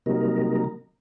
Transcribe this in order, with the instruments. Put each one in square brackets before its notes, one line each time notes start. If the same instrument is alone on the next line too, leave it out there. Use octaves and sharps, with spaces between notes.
[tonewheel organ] C3 F#3 G3 A#3 D#4 A#4